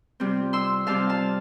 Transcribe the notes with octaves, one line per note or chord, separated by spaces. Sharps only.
C3 G3 C4 F4
C6 E6
C3 G3 C4 F4 F5 A5
F5 A5